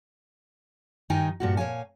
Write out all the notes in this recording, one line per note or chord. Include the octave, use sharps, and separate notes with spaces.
G2 D#3 D#4 G5 G#5
G2 A#2 F#4
A#2 C#5 F5 G#5